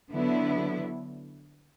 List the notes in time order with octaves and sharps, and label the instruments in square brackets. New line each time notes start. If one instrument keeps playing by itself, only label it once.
[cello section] D3 F#3 B3 E4